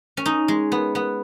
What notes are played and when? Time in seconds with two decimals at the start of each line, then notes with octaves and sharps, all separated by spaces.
0.17 C#4
0.26 D#4
0.48 G#3
0.72 B3
0.95 B3